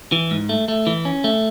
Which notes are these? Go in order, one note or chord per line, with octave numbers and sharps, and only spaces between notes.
E3
G#2
A3
A3
E3
C#4
A3